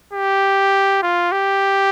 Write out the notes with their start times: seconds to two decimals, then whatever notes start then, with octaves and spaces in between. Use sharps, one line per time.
0.13 G4
1.02 F4
1.32 G4